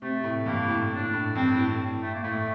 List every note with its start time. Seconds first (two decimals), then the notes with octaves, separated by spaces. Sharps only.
0.01 C3 A3
0.24 A2
0.46 G2 A#3
0.68 A2
0.90 D4
1.13 A2
1.35 G2 C4
1.57 A2
2.01 A3
2.14 A#3
2.23 A2 A3